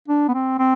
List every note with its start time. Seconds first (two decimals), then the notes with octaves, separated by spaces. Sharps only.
0.08 D4
0.28 B3
0.34 C4
0.59 C4